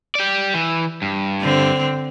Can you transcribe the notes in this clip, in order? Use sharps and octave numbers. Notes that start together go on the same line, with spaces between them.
G4 D5
E3
G2
D3 C4